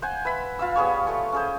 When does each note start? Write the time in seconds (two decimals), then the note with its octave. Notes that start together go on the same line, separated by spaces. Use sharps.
0.02 C5 F#5 G#5
0.25 B4 E5 B5
0.59 F4 F5 E6
0.76 G3 B3 G#4 C#5
1.07 A3 A4 C#6
1.32 C#4 G#4 C5